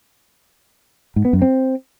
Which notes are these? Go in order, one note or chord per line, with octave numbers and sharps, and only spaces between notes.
G#2
B3
F#2
C4